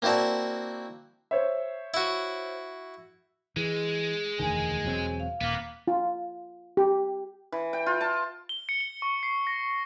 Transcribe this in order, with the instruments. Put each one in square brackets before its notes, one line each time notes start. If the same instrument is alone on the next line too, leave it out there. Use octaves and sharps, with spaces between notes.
[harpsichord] A#3 C4 E4 F#4 D5 A5
[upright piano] C5 C#5 E5
[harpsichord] E4 F#4
[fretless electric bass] E3 [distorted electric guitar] G#3 [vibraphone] G#4
[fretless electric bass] E1 D2 D#3 [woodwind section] G#5
[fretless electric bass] E1 F#3 C4
[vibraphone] F5
[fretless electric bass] D#1 [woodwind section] A#3 [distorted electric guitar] B3
[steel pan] F4
G4
[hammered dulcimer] E3
G5
F4
A5
[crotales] G7
C#7
G7
C#6
C7
A#6